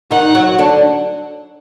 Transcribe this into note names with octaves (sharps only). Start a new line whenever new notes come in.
D#3 D#4 F#5
F#3 F#4
D3 D4